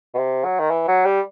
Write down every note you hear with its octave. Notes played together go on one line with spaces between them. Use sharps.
B2
C3
F#3
D#3
E3
F#3
G3